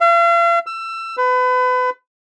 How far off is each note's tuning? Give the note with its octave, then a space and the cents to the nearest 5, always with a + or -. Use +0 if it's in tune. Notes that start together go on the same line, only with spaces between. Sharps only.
F5 -45
E6 +25
B4 +30